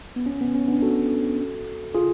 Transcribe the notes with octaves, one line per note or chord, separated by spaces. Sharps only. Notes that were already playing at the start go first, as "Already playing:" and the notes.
B3
C#4
B3
C#4
B3 D4
F#4 A4
F4 G#4